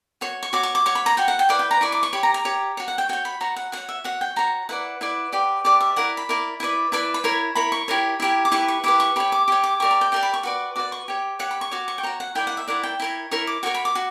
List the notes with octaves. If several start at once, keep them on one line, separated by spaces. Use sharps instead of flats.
F#4 C#5
C#6
F#4 C#5 D6
C#6
D6
F#4 C#5 C#6
B5
A#5
F#4 C#5 G5
F#5
G5
E4 B4 D5 F#5
G5
A#5
E4 B4 D5 C#6
D6
C#6
G4 C#5 B5
A#5
A#5
G4 C#5
F#4 C#5
F#5
G5
F#4 C#5 G5
B5
F#4 C#5 A#5
F#5
F#4 C#5 F#5
E5
F#4 C#5 F#5
G5
F#4 C#5 A#5
E4 B4 D5 F#5
E4 B4 D5
G4 B4 D5
G4 B4 D5 D6
E5
E4 A#4 D5 F#5
B5
E4 A#4 D5
E4 B4 D5
E4 B4 D5 B5
B5
E4 A#4 C#5
E4 A#4 C#5 B5
C#6
E4 G4 A#4 C#5
E4 G4 A#4 C#5
D6
E4 G4 B4 C#6
C#6
E4 G4 B4 D6
C#6
G4 C#5 B5
D6
G4 C#5
D6
G4 A#4 D5 C#6
A#5
G5
G4 A#4 D5 G5
B5
C#6
F#4 B4 D5
F#4 B4 D5 D6
C#6
G4 C#5
G4 C#5 F#5
B5
C#6
F#4 C#5 D6
C#6
G5
F#4 C#5 A#5
F#5
E4 A#4 D5 G5
F#5
E5
E4 A#4 D5 F#5
G5
E4 A#4 C#5
E4 A#4 C#5 C#6
D6
F#4 A#4 C#5 C#6
B5
D6
F#4